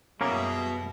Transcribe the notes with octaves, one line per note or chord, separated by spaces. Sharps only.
F#2 B2 G3 A#3 C#4 E4 G#4 A#4